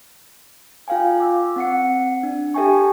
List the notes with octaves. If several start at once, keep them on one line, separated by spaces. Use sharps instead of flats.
F4 A4 F5 G5 G#5
D6 E6
C4 F#5 C#7
D4
G4 A4 E5 G5 G#5 C#6